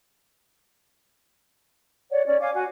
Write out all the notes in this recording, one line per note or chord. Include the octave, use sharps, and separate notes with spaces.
C#5 D5 F#5
C#4 D5
C#5 F5 G#5 D6
F#4 F#5 G#5